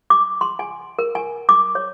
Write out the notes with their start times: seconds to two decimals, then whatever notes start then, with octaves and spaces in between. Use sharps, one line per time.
0.10 D6
0.41 C6
0.59 G#5
0.99 A#4
1.15 G#5
1.49 D6
1.75 C#5